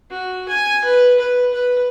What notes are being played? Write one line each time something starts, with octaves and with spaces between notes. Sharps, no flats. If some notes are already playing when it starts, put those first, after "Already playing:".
F#4
G#5
B4
B4
B4